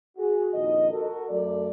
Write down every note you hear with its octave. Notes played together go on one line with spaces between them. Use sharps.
F#4 G#4
A#1 F2 D#3 D#4 D#5
F#4 A4 A#4
F#2 A3 D5